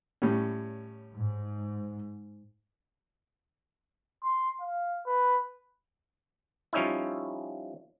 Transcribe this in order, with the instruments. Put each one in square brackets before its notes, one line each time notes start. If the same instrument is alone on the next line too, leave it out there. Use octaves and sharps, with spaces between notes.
[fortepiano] A2 G3 C#4
[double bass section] G#2
[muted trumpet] C6
F5
B4
[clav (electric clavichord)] F3 G3 C#4 D#4 E4